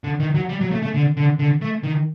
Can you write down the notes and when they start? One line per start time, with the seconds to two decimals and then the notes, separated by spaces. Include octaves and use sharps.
0.04 D3
0.20 D#3
0.35 F#3
0.49 G3
0.61 F#3
0.72 A3
0.82 A3
0.94 D3
1.17 D3
1.39 D3
1.61 A3
1.83 D#3